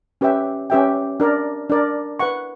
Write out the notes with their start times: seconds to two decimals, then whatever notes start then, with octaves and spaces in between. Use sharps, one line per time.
0.21 C#4 G4 B4 E5 G5
0.70 C#4 G4 B4 E5 G5
1.20 D4 A#4 D5
1.70 D4 A#4 D5
2.19 B4 F#5 C#6